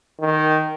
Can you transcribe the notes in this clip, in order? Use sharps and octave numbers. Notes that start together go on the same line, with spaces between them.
D#3